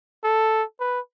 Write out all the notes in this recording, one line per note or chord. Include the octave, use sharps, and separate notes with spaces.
A4
B4